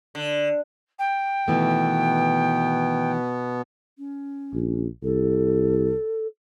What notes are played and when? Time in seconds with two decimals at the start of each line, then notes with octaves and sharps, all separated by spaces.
0.15 D3
0.98 G5
1.48 B2 D#3 E3 A3 B3
3.98 C#4
4.53 A#1
5.03 C2 A4